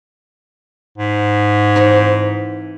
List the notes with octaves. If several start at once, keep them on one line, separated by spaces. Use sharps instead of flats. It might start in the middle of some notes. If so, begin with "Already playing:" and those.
G#2
E3 C4 D#4